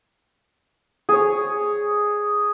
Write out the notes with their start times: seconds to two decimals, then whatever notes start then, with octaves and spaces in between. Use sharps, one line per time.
1.09 G#4 C#5